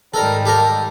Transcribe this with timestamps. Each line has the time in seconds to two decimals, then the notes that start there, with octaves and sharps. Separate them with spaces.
0.14 G#2 D#3 G3 A4 A#4
0.45 G4 A4 A#4